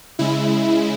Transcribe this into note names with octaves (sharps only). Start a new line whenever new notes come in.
C#3 G#3 E4